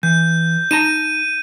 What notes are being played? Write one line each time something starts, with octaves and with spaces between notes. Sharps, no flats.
E3 G6
D#4 A5 A#5 D#7